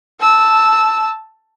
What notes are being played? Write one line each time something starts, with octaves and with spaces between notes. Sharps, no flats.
A5 E6